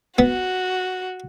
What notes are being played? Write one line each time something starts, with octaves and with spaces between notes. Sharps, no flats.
B3 F#4